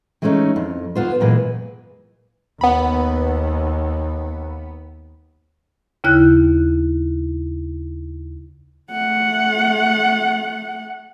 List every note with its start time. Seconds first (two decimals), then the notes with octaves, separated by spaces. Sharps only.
0.22 E3 G#3 A3 B3 C#4 D#4
0.56 F2
0.95 D2 B3 F4 C5
1.20 F#2 A#2 E3 G#3
2.61 D#2 B3 B5
6.04 D#2 C#3 E4 F#6 G6
8.91 A3 F#5